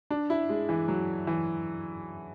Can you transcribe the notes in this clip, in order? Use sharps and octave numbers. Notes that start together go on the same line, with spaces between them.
D4
E4
G#3
E3
F#3
E3